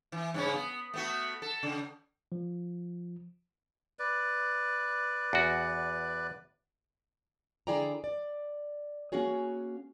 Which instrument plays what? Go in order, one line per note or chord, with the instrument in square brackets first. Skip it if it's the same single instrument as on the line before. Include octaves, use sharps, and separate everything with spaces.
[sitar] E3
G2 C#3 C#4
B3
A3 B3 F#4
A4
C#3
[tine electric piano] F3
[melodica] B4 D5
[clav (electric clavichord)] E2 F#4
[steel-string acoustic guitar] D3 E4 G#4 D5 G5 A#5
D5
A#3 C#4 F#4 G#4 C#5